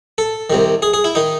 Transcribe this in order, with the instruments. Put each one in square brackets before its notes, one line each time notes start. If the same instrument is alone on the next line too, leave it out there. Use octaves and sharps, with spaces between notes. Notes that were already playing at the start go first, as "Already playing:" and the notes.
[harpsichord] A4
C2 C3 D#3
G#4
G#4
E4
D#3 D#4